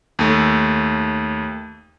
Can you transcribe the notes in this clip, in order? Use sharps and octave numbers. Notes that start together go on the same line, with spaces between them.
D#2 A3